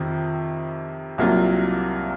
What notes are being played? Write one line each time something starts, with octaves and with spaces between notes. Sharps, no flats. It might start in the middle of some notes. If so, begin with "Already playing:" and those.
Already playing: F2 C3 D#3
C2 C3 F#3 A#3 F4